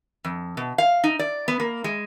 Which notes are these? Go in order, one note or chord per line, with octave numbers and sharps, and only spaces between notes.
F2
B2
F5
D#4
D5
B3
A#3
G#3